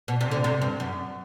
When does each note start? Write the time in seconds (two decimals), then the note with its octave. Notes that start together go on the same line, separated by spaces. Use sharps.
0.08 B2
0.21 C3
0.31 D2 D3
0.44 C3
0.62 G2
0.80 F#2